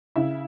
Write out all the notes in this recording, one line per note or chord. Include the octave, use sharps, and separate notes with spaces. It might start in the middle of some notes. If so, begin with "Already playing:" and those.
C#3 E4